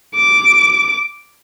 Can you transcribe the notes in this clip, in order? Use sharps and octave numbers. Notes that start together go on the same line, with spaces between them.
D6